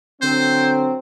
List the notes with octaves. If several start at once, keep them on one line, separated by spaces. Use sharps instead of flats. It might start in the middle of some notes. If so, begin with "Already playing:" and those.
D3 F#3 C4 C5